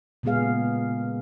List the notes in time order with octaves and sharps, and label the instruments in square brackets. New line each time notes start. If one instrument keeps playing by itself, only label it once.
[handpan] A#2 C#3 G#3 B3 G#4 F5